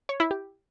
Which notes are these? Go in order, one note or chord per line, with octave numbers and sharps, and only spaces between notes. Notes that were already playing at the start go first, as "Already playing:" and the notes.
C#5
E4
G4